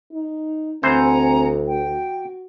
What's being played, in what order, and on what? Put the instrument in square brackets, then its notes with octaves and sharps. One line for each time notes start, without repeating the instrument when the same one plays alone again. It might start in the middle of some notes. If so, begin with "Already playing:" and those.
[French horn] D#4
[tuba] D2 [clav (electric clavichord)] E3 C5 [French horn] C4 [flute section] F#5 G#5 A#5
[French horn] F#4 [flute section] G5